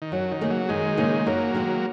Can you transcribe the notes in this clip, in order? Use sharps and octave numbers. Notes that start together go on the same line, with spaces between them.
D#3
F#2 F#3
D#3
C#3 A#3 D#4 G#4
F#3
F#2 D#3 G#3
C#3 A#3 D#4 G#4
F#2 F#3 A#3
D#3 G#3 F#4